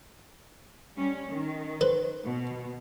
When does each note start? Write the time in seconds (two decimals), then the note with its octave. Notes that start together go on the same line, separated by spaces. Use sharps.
0.97 G3 C#4
1.30 D#3
1.81 B4 C5
2.24 B2